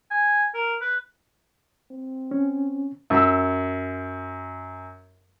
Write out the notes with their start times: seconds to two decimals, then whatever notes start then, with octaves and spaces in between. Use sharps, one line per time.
0.10 G#5
0.54 A#4
0.81 B4
1.91 C4
2.31 C#4
3.10 F#2 E6